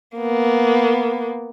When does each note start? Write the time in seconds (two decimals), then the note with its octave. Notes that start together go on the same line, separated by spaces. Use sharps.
0.17 A#3 B3